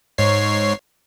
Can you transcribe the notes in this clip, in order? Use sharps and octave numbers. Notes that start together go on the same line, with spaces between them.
G#2 C#5 C7